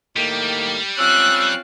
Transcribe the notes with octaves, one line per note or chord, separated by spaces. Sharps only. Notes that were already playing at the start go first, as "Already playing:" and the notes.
A2 D#3 G3 A#3
C4 C#4 F4 E6 F#6